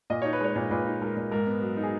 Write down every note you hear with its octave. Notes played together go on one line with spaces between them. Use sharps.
A#2 D#5
D#4 C#5
B4
G#3 C#5
A#2
A#2 B4
D#4
G#3 A#4
A#2
G#2 A#4
B3
F#3
D#4
G#4